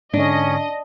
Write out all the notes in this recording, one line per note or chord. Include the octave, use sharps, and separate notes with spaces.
G#2 D3 C#4 D4 D#5